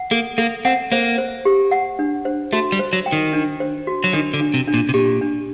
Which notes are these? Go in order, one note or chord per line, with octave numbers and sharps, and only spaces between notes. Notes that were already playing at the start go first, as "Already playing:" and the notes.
Already playing: F#5
A#3 A4
A#3 A4
C4 F#5
A#3 C5
C5
G4
F#5
D4
C5
A3 F#4
G3
C5
F#3
G5
D#3
D4
C5
F#4
F#3
D#3 D4
D3
D4
C3
D4
A#2
C3
A#2 G4
D4